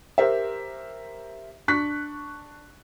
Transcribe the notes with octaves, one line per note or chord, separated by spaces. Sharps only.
G4 A#4 C5 E5
D4 C#6 F#6 B6